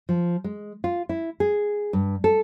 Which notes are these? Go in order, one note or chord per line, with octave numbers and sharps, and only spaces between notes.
F3
G#3
F4
E4
G#4
G2
A4